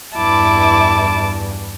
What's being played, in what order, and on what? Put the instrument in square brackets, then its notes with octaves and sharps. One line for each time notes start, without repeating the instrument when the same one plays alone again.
[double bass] E2 G2 [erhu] E4 [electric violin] A5 D6